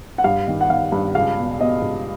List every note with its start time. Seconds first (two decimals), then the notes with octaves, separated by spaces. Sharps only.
0.18 F#5
0.24 G2 F5
0.48 D#3
0.61 F#5
0.70 D#3 F5
0.92 G2
1.15 C#2 F5
1.38 B2
1.60 B2 D#5
1.82 C#2